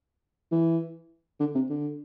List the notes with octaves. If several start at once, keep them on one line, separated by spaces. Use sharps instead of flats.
E3
D3
C3
D3